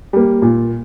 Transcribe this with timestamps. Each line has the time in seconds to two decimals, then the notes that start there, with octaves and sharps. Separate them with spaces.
0.13 G3 A#3
0.42 A#2